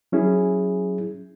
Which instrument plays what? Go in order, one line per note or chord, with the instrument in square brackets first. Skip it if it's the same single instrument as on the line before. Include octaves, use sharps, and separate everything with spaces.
[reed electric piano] F#3 C#4 E4 G#4